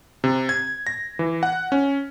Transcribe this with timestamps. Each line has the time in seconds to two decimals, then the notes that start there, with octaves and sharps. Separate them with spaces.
0.24 C3
0.49 G#6
0.87 A#6
1.19 E3
1.43 F#5
1.72 C#4